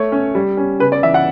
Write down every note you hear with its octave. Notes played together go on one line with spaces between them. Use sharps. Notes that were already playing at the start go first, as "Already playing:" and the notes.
Already playing: A3 C#5
C#4
G3
C#4
C#3 B4
D5
E3 E5
F#5